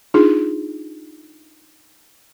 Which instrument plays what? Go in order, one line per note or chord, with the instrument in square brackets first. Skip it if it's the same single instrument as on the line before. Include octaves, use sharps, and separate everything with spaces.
[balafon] D4 D#4 F4 G#4